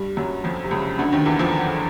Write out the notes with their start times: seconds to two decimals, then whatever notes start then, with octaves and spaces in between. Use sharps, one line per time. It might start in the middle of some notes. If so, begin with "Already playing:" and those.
Already playing: G2 G3
0.17 F#2 F#3
0.44 F2 F3
0.64 C3
0.71 C#2 C#3
0.99 D2 D3
1.13 D#2 D#3
1.26 E2 E3
1.39 F2 F3